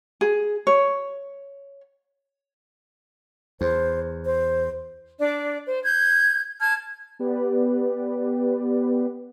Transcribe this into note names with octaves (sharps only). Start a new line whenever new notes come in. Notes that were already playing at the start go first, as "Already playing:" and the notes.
G#4
C#5
E2 C5
C5
D4 D5
C5
G6 G#6
A5 F6 G#6
B3 G4 B4 D5